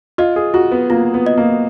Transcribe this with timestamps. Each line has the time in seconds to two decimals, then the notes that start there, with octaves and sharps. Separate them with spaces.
0.18 F4 D#5
0.36 G#4
0.54 F4 F#4
0.72 B3
0.90 A#3 F4
1.14 B3
1.26 D#5
1.37 A#3